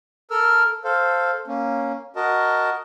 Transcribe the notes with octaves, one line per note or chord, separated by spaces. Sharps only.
A4 A#4 E6 F6
A4 C5 F5
A#3 C#4
F#4 A#4 D#5 A5